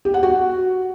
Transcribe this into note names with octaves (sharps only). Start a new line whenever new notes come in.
G4
F#5
F#4